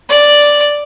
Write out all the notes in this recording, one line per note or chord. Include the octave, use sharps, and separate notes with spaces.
D5